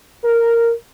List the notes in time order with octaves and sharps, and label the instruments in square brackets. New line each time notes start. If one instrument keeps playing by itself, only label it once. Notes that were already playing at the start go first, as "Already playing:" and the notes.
[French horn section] A#4